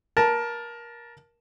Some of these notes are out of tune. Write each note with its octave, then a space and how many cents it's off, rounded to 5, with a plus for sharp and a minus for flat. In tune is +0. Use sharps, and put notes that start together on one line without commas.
A#4 +20 A5 +0